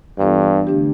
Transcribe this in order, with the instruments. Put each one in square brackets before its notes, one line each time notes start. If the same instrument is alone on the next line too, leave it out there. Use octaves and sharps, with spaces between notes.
[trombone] G2 [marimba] E3 B3 D4 F4 A4
[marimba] D3 A3 D4 G4